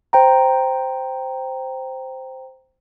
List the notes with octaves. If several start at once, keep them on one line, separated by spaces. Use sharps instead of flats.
C5 G5 A#5